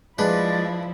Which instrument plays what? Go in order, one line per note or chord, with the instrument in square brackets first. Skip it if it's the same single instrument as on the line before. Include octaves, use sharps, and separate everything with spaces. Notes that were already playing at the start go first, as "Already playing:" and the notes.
[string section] F3 E4 [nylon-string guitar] G#3 [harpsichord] D4 B4 [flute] D5